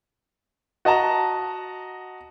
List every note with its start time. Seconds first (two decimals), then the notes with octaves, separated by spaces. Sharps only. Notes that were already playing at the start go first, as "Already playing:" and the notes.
0.85 F#4 D#5 A5 A#5